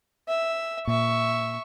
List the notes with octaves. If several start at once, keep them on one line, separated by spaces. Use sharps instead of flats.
E5
A#2 E5 C#6